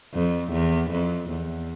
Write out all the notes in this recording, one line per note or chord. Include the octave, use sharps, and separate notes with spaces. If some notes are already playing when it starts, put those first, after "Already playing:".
F2
E2
F2
E2